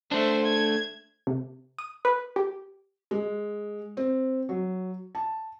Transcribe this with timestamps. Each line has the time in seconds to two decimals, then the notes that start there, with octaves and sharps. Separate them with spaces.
0.11 A3 D4 C5 E5
0.46 G#6
1.27 C3
1.79 D#6
2.05 B4
2.36 G4
3.11 G#3
3.97 C4
4.49 F#3
5.15 A5